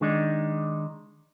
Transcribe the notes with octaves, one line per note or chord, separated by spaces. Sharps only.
D#3 G#3 D4 D#4